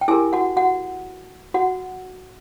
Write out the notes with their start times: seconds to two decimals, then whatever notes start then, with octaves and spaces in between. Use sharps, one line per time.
0.01 G5
0.08 E4 G4 G#4 A#4 G#5
0.33 F#4 F#5
0.57 F#4 F#5
1.54 F#4 F#5